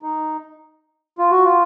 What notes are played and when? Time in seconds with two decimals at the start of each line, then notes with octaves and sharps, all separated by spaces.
0.02 D#4
1.18 F4
1.31 F#4
1.44 F4